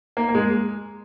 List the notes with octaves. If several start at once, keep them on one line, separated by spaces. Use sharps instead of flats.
A#3
A#3
G#3